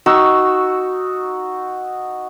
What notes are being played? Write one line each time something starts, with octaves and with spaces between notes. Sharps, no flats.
D#4 F#4 C#6 E6